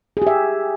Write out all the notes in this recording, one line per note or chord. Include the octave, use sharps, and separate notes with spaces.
G4 G#4 E5